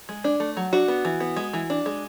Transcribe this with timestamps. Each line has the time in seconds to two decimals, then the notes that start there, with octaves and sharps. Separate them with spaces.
0.09 G#3
0.24 D4
0.40 A3
0.57 F#3
0.73 D4 F#4
0.88 B3
1.05 E3
1.20 B3
1.37 G#3
1.53 E3
1.70 D4
1.86 G#3